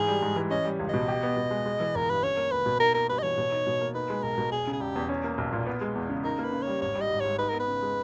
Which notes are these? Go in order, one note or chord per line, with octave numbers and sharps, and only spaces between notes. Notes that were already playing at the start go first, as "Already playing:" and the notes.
Already playing: G#2 E3 G#4
G3
G#2
E3
C#4 D#5
G3
C#2
B2 D#5
G4
B3
B2
G#3
G#3
E3
G1 A#4
G2 B4
C#4 C#5
A#3
C#2 B4
B2
D#4 A#4
A#3 A#4
G2 B4
D#5
E3 C#5
B2
D#4
B2
A#3
D#4 B4
G#3
B1 A#4
B2
E1 G#4
C#3
G#4
E1 G4
E2
C#4
A#3
B1
A#2
B3
G#3
E2
C#3
D#4 A#4
A#3
B4
C#3
G3 C#5
G#1 C#5
G3
D#5
G#1
G#2 C#5
D#4 B4
B3 A#4
B4
C#3
G#3